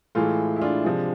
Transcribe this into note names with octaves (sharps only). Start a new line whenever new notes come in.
A2 E3 G#3 F4 A4
E4
D4 F4
C3 F3 G#3 D4